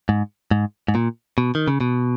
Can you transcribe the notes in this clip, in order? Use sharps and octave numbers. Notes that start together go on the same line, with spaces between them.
G#2
G#2
G#2
A#2
B2
D#3
C#3
B2